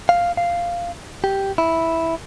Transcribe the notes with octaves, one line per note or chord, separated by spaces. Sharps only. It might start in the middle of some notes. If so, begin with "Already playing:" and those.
F5
F5
G4
E4